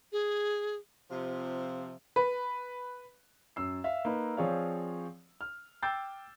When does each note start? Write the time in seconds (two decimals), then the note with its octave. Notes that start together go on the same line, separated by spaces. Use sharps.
0.12 G#4
1.11 C3 F3
2.16 B4
3.56 F#2 E6 C7
3.84 E5 F5
4.05 A#3 D#4 B4
4.37 F3 C4 G#4 C#5 D5 F5
5.41 F6
5.82 G5 D6 E6 G6 A6 C7